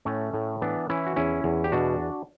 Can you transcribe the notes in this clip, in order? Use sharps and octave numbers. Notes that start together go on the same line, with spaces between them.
A2 A3 C#4
A2
E3 B3 D4
E3 C#4 E4
F#4
E2 C#4 E4
E2
G4
B2 D4 F#4